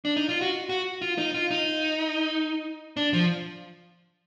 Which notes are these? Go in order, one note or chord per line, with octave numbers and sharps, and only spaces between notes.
D4
D#4
F4
F#4
F#4
F4
D#4
F4
D#4
D4
F3